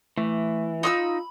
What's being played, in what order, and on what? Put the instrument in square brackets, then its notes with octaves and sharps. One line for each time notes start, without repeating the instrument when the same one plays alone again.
[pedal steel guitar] E3 [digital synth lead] A3
[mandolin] D#4 D#6 E6 [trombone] F4 [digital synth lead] B5